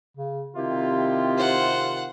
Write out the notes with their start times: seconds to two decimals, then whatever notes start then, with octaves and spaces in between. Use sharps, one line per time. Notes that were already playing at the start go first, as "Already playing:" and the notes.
0.17 C#3
0.56 C3 D#3 C4 E4 F4 G4
1.37 C5 F#5